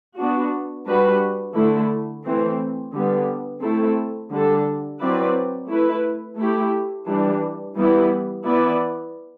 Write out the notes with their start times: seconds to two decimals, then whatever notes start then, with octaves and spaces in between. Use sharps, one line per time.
0.18 B3 D4 F#4
0.87 G3 D4 F#4 B4
1.55 D3 A3 E4
2.24 E3 A3 C4
2.93 D3 G3 B3
3.62 A3 C4 E4 A4
4.32 D3 G3 D4 A4
5.01 F#3 C4 E4 B4 D5
5.69 A3 E4 B4
6.38 A3 E4 G4
7.07 E3 G3 D4
7.76 E3 G3 B3 E4
8.45 E3 B3 E4 B4 D5